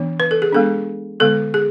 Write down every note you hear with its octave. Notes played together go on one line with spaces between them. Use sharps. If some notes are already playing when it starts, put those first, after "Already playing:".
Already playing: E3 B3 D4
B4
A4
G#4
G#3 B3 D4 A4
D3 G#3 B3 A4
G#4